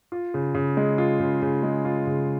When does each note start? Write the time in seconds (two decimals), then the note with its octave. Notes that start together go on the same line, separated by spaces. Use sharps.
0.12 F4
0.34 C#3
0.55 C#3
0.77 G#3
0.98 F4
1.20 C#3
1.42 C#3
1.63 G#3
1.85 F4
2.07 C#3